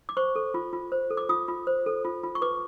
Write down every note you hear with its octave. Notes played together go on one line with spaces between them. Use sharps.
D6
C5 C#6
A4
F4
F4
C5
A4
D6
F4 D#6
F4
C5
A4
F4
F4
C#6
B4 D6